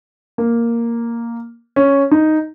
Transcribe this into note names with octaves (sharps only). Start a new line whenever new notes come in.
A#3
C#4
D#4